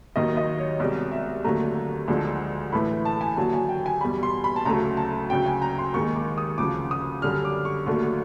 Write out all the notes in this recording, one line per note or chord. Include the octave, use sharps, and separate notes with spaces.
D#2 D#3 F#3 D#5
D#5
C#5
C2 B2 G#3 D5
E5
D#2 D3 F#3 A3 A#5
D2 D3 F3 G#3
A2 E3 A3 B5
A5
G#5
D#2 D3 F#3 A5
G#5
G5
G#5
E2 B2 G3 B5
C6
B5
A5
D2 C#3 F#3 A3 A#5
A5
D2 C#3 F#3 G5
G#5
A#5
C6
D#2 D#3 G#3 C#6
D6
D#6
D2 C#3 F3 D6
D#6
F#2 D3 G3 F6
D6
C#6
D#2 D3 F#3 A3